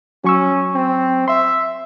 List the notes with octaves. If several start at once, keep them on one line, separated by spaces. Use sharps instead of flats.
F#3 C#4 C#6 E6
C4
E5 C6